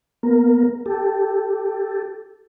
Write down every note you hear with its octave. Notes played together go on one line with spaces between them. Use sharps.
A#3 B3 A#4
G4 A4